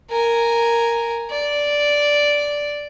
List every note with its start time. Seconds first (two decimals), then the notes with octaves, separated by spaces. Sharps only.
0.11 A#4 G#5
1.31 D5